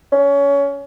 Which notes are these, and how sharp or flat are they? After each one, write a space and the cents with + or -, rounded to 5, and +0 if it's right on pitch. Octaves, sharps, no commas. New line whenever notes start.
C#4 +25